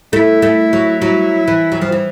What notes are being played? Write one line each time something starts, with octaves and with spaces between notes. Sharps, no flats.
A3 E4
A3
F#3
F#3 E4
E3
F#3
F3
E3